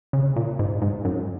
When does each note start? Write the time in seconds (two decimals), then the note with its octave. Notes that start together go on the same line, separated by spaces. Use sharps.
0.13 C#3
0.36 A#2
0.59 G#2
0.82 G#2
1.05 F#2